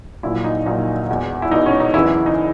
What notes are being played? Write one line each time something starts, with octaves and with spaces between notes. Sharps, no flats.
A#1 A#2 F#3 E4
D#4
A#1 A#2 F#3 D#4
E1 E2 B2
E4
E1 E2 B2 D#4
C#4
D#4
F#1 E2 C#3 E3 E4
E4
D#4